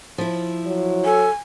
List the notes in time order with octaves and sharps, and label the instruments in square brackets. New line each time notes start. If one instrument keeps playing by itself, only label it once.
[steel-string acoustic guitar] F3 E4
[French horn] F#3
[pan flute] A4 [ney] G#5